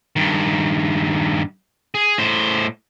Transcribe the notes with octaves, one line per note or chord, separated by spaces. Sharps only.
G2 D#3
G#4
A2 C5